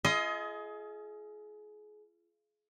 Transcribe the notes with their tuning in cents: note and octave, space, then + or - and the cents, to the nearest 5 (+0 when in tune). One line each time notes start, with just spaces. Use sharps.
F4 -35 G#4 +30 D#5 +20